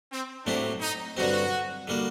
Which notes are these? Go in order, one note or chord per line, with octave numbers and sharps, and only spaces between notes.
C4
A2 F#3 A3 C4 D4 G4
D#4
G2 D3 F#3 C4 F#4
D3 G3 A#3 F#4